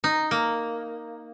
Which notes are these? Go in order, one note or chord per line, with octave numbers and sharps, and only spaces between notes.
D#4
A#3